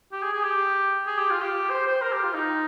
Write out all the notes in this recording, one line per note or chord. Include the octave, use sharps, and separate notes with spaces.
G4
G#4
G#4
G4
G#4
G4
F4
G4
C5
C5
A#4
G4
F4
D#4